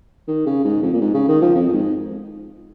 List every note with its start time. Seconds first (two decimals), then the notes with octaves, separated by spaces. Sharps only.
0.28 D#3
0.46 C#3
0.65 G#2
0.82 F2
0.93 A#2
1.01 G#2
1.14 C#3
1.28 D#3
1.42 F3
1.55 F2
1.68 F2
1.73 G#2